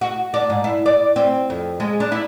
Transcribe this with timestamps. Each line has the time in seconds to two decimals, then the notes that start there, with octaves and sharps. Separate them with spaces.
0.01 F#4
0.34 D4
0.50 G#2
0.64 E4
0.86 D5
1.16 C4
1.50 F2
1.80 G#3
2.00 D4
2.12 E4